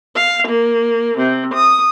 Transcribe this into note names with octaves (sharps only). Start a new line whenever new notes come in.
F5
A#3
C3
D#6